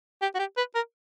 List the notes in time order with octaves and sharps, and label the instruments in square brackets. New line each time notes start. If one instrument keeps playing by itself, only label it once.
[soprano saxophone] G4
F#4
G4
B4
A#4